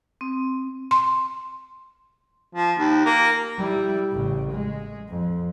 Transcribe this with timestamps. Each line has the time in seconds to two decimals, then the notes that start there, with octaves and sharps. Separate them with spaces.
0.21 C4
0.91 C6
2.55 F3
2.77 D#2
3.05 A#3
3.58 G3 E4
4.12 A1 C#3
4.52 G#3
5.09 F2